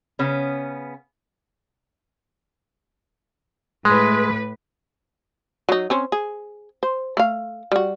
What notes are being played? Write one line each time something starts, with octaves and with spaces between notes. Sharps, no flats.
C#3 B3 C#4
A2 G#3 B4
F#3 D#4
C4 C#4 C5
G#4
C5
A3 F5
G3 F#4